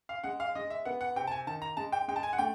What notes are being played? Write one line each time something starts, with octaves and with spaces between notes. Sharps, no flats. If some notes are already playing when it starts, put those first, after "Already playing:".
F5
G#3 F#5
F5
G#3 D#5
E5
B3 F#5
F#5
C3 G5
A5
G#5
D#3 A5
A#5
G#3 A5
G5
G#3 G5
A5
G#5
F#5
A3 G5